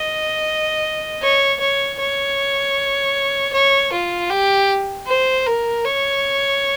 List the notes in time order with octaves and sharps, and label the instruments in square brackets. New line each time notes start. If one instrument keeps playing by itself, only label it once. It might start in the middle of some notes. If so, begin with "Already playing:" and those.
Already playing: [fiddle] D#5
C#5
C#5
C#5
C#5
F4
G4
C5
A#4
C#5